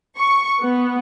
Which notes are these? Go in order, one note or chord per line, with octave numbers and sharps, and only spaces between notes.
C#6
B3